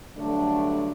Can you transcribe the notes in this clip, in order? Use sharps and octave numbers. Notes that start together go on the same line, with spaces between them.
G2 D3 F#3 A3 D4